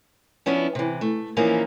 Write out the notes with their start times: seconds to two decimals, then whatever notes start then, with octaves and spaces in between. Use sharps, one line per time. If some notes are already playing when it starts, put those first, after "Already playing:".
0.46 F3 B3 C#4 D4 E4
0.75 C3 E3
1.01 A3
1.36 E3 F3 A#3 C#4 D#4 A#4